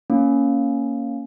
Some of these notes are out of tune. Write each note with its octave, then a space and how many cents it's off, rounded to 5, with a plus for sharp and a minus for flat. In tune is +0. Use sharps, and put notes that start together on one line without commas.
A#3 +0 C#4 +0